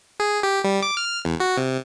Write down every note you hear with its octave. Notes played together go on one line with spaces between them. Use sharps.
G#4
G4
G3
D6
F6
E2
F#4
C3